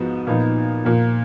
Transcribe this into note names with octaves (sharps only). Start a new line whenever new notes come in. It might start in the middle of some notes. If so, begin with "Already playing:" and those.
Already playing: G#2 F3 B3 D#4 F#4
A#2 F3 B3 D#4
A#2 F3 A#3